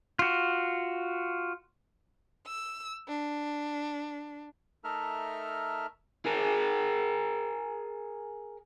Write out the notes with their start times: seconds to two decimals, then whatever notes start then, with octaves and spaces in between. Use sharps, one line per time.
0.19 F4 F#4
2.47 E6
3.08 D4
4.84 A3 D#4 A4 A#4 E5 F6
6.25 G#4 A#4